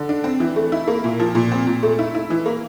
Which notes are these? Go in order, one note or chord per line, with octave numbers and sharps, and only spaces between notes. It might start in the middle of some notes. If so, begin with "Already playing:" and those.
Already playing: D3
D4
C4
E3
A3
E4
A#3
A#2
F3
A#2
C4
A#2
A3
E4
E4
E3
A#3